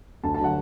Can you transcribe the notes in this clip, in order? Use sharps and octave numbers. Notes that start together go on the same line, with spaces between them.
D2 A5
A5
D3 F#3 F#5